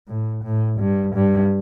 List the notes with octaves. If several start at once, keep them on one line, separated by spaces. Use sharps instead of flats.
A2
A2
G2
G2